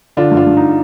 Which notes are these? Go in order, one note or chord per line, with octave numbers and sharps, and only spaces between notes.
D3 D4 F4
G2
D4 F4
G2
D#4